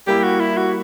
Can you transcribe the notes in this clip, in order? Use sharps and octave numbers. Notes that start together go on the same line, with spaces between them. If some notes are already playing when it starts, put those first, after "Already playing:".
G3 A#3 E4 G4
F#4
E4
F#4